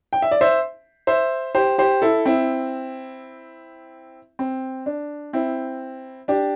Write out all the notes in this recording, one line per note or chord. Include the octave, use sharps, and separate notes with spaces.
G5
E5
D5
C5 E5
C5 E5
G4 C5
G4 C5
E4 A4
C4 E4
C4
D4
C4 E4
D4 G4